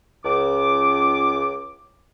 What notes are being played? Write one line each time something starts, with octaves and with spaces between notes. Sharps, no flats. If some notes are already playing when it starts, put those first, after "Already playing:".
C#2 D6